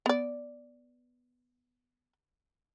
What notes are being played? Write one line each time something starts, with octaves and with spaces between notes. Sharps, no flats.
B3 D5